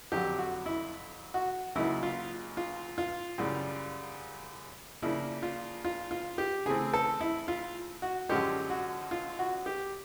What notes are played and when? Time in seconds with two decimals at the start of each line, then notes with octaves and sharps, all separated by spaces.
0.12 F2 D3 F#3 G4
0.38 F#4
0.66 E4
1.34 F#4
1.75 C#2 C#3 F#3 A#3 D#4 E4
2.03 F4
2.57 F4
2.98 F4
3.38 F#2 C#3 E3 G3
5.02 C#3 F3 A#3 D4 E4
5.43 F4
5.85 F4
6.11 F4
6.38 G4
6.66 C#3 E3 A3 C4 G#4
6.94 A4
7.21 E4
7.48 F4
8.02 F#4
8.29 F#2 D3 F3 G#3 C#4 G4
8.70 F#4
9.11 F4
9.39 F#4
9.66 G4